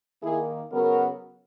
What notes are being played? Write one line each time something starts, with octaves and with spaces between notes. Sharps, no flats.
D#3 A#3 E4 G#4
C#3 F#3 B3 F#4 A#4